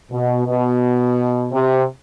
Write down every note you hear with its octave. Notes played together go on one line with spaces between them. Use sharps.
B2
B2
C3